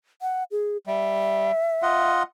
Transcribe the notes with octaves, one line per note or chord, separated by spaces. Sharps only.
F#5
G#4
G3 E5
F4 D#5 F#5